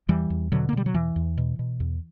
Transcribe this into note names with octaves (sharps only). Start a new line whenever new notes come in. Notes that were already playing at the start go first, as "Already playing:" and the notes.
E2 E3 G3
E2
B2 D3 F#3
A#3
B2 G3
F#3
E2 E3
E2
B2
B2
E2